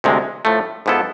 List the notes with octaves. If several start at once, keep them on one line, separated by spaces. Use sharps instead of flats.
D2 C3 G#3
A2 F3 A3
G#2 F3 B3 E4 A4